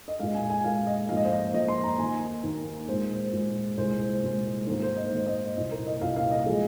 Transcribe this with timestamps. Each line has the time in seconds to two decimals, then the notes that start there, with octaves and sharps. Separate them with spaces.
0.08 D#5
0.20 A#2 G#3 F5
0.35 G#5
0.50 G#5
0.64 A#2 F5
0.68 G#3
0.87 D#5
1.09 G#2 F3 A#3 F5
1.17 D#5
1.24 C5
1.32 D#5
1.54 G#2 F3 A#3 D#5
1.68 C6
1.84 A#5
1.98 D#2 D#3 A#3 G#5
2.43 D#2 D#3 A#3
2.89 A#2 G#3 C5
3.33 A#2 G#3
3.77 C2 A#2 G#3 C5
4.22 C2 A#2 G#3
4.67 G#2 D#3 A#3 C5
4.83 C5
4.97 D#5
5.12 G#2 D#3 A#3
5.26 D#5
5.57 C2 A#2 A#3 D#5
5.71 A#4
5.87 D#5
6.01 C2 A#2 A#3 F5
6.16 F5
6.31 D#5
6.46 F3 G#3 G#4